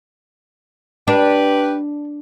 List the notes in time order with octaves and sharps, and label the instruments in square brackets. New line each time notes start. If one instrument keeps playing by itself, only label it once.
[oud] D4 [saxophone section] G4 B4